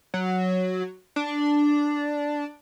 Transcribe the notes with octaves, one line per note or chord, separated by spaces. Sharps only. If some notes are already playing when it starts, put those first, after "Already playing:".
F#3
D4